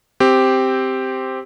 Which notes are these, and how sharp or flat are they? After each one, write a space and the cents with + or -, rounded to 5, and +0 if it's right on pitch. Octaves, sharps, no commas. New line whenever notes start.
C4 +0 G4 +0